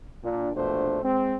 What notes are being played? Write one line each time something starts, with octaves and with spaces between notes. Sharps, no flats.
A#2 D4
A#1 B2 A3 D4 C5
G#3 C4